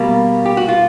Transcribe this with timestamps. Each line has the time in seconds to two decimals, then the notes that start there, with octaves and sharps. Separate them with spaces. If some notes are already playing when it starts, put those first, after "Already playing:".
Already playing: B2 G3 A#3
0.46 G4
0.57 F#4
0.68 F4